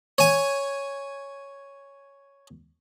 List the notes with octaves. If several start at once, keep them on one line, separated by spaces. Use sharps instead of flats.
C#5 G#5